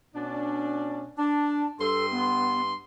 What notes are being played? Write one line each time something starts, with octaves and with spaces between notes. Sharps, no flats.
B2 C#4 D4
D4 A5
G2 A4 C6
B3